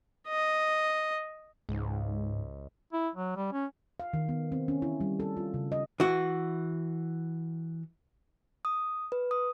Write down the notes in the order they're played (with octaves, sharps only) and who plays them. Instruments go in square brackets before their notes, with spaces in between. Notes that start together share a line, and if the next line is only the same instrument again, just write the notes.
[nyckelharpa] D#5
[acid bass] C#2 [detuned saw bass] G#2
[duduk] E4
F#3
G3
C#4
[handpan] F5
D#3
B3
C4
C#4
E4
G3
A4
F4
C#3
D#5
[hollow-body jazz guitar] E3 F#4
[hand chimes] D#6
B4
D#6